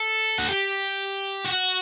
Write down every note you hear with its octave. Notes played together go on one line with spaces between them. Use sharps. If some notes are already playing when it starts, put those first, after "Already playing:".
Already playing: A4
F#4
G4
F#4